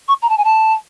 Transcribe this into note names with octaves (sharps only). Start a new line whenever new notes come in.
C#6
A#5
A5
G#5
A5